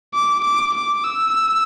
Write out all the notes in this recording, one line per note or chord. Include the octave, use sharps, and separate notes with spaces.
D6
D6
D6
E6